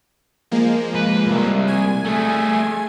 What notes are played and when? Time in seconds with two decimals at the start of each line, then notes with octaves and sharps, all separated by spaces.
0.51 F3 G#3 A#3
0.95 B4
1.27 C2
1.68 G#5
2.05 A3 G#4